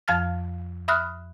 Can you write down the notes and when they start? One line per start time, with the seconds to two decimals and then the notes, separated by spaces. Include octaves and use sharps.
0.08 F2 F3 F5 A5 F6 A6
0.88 E5 B5 D#6 F6 F#6